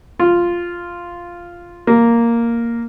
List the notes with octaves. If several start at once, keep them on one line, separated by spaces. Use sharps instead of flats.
F4
A#3